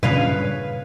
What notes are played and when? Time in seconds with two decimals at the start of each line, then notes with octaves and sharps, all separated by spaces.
0.03 G2 A#2 C#3 B4 C#5 F5